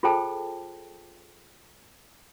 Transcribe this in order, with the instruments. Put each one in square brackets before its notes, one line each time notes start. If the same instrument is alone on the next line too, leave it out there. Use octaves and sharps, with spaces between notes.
[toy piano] F4 G#4 A4 C5 G5 A5